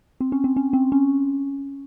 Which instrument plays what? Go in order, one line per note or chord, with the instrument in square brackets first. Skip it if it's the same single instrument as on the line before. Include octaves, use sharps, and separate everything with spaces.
[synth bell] C4
C#4
C4
C#4
C4
C#4